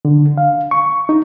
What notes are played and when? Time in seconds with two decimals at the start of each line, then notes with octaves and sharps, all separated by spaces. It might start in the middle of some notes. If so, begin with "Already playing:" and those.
0.05 D3
0.38 F5
0.71 C#6
1.09 D#4